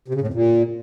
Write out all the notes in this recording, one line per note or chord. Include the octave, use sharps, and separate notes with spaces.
C3
C#3
A2
F2
A#2